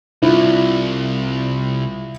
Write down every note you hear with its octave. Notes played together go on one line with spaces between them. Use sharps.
C2 E4 F4